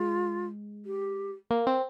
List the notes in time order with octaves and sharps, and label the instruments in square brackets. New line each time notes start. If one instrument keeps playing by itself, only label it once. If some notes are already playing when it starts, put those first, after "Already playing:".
Already playing: [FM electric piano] G#3 [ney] F4
[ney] G4
[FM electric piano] A#3 [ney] A#4
[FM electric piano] C4